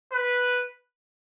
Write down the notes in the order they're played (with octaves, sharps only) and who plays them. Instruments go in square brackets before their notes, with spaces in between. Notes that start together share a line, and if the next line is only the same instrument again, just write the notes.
[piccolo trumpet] B4